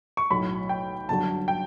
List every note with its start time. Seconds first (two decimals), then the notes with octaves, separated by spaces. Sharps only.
0.17 C#6
0.30 B1 A2 F#3 B5
0.69 G5
1.09 G1 F#2 D3 F#3 A5
1.48 G5